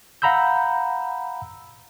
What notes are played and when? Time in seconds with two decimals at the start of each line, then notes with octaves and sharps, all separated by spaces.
0.22 F5 F#5 A#5 B5 E6 G6